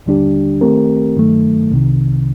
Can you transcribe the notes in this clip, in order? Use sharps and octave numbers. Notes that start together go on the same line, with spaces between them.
D#2 D3 G3 D4 G4
D#3 A3 C4 G4 A#4
G2 D#3 F#3 A3
C2 C3 D#3